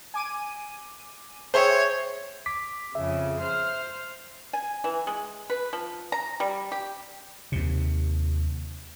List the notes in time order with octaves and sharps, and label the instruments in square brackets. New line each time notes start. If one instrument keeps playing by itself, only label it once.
[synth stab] G#5 D6 D#7
[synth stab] G#4 E5 G5 [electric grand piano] C5 [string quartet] C#5
[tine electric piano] D6 B6
[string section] F2 C#3 [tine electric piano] E5
[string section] C5 F6
[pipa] G#5
E3
G#3
B4
F3
A#5
G3
G4
[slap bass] D#2 C3